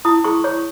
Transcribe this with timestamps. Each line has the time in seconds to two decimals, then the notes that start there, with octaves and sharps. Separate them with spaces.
0.05 E4 D#6
0.24 G#4 C#6
0.44 C#5 C#6